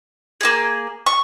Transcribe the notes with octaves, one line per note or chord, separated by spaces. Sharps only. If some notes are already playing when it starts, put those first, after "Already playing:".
A#3 D#4 G#4
C#6